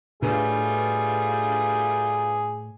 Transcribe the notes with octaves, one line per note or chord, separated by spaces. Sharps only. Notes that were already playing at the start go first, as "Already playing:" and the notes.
A2 G3 A3 D4 F4 G#4 B4